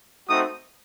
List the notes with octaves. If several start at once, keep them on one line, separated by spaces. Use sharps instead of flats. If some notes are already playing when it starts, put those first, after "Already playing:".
A3 C4 D#4 F#4 D#6